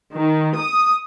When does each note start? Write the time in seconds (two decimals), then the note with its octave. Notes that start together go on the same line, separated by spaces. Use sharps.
0.16 D#3
0.57 D#6